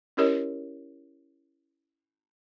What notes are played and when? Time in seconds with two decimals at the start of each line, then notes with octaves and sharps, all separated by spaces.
0.17 C#4 E4 G4 A#4 C#5 D#5